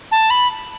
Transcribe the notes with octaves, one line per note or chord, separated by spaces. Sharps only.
A5
B5